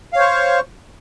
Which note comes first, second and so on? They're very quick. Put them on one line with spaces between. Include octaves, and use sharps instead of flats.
F5 C#5 C5 C#6